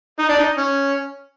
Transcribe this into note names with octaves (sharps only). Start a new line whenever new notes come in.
D#4
D4
D#4
C#4